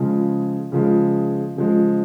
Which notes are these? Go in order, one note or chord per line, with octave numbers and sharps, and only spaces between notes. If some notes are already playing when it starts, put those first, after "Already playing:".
Already playing: C#3 F3 G#3
C#3 F3 G#3
C#3 F3 G#3